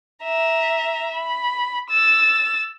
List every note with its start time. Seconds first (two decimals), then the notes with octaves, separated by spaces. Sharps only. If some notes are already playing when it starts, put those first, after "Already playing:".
0.24 E5 A#5
1.15 B5
1.90 E6 A6